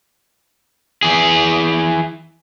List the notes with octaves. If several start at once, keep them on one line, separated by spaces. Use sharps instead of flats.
E3 G#4